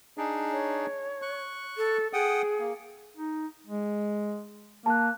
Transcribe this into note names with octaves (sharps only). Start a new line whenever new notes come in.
D4 D#4 G#4
C#5
C#6 F#6
A4
G#4 F#5 G5 D#6
A#3
D#4
G#3
A#3 A5 F#6